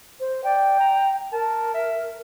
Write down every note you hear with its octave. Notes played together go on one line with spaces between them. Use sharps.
C5
D5 G5
A#5
A#4 A5
E5